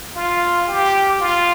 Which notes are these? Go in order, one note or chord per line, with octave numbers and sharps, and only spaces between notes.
F4
G4
F4